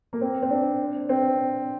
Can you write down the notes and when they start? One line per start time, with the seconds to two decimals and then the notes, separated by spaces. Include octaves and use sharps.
0.13 A#3
0.21 C4
0.42 C4
0.50 D4
1.09 C4